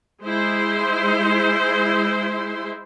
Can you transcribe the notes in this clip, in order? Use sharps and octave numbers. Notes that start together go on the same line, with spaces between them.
G#3 E4 C5 C6